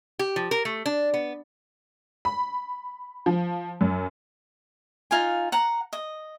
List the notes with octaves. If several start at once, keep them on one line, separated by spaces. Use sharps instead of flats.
G4
F3
A#4
A3
D4
B3
B5
F3
F#2
D#4 F4 F5 G#5
F#5 A#5
D#5